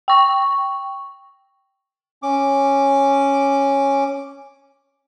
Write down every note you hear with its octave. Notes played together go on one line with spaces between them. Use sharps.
G5 C#6
C#4 D6